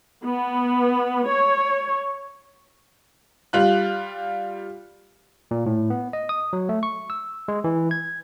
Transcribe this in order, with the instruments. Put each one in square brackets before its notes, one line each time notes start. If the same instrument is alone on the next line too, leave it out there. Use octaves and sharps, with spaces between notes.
[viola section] B3
C#5
[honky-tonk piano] G3 F4 F#6
[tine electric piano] A#2
A2
B3
D#5
D#6
F#3
A3
C#6
E6
G#3
E3
G#6